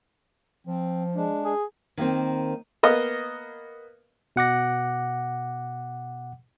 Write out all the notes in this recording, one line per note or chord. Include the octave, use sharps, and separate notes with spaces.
F3 C4
G#3 D4
G#4
D#3 A#3 C4
A#3 B3 D#5 F5
B2 F#5 D6 A#6